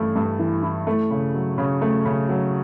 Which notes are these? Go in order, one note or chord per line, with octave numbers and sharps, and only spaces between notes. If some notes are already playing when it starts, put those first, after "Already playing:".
Already playing: G2 E3 A3 E4
G2
E3
E4
A3
C#3
F#3
C#3
A3
C#3
F#3